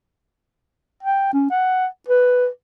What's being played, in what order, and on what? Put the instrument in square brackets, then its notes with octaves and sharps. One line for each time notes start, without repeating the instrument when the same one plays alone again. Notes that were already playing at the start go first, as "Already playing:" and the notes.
[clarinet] G5
C#4
F#5
B4